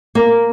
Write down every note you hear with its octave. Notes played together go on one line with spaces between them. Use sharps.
A#3